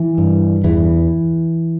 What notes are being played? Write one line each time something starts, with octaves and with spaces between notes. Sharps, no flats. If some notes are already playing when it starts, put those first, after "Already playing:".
Already playing: E3
G2
E2 E3